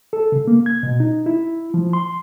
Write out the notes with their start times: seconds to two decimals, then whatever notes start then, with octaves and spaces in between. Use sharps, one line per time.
0.13 A4
0.32 C#3
0.47 A#3
0.66 G#6
0.83 B2
1.00 D#4
1.26 E4
1.74 F3
1.93 C6